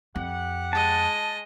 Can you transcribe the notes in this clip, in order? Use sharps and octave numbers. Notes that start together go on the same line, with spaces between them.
F2 G4 F#5
G#3 D#5 A5